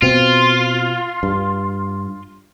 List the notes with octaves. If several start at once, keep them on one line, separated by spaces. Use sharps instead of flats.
B2 C4 F4
G2